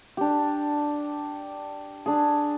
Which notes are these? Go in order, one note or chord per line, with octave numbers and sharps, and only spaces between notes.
D4 G4
D4 G#4